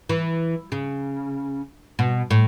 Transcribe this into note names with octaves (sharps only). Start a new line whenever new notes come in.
E3
C#3
B2
A2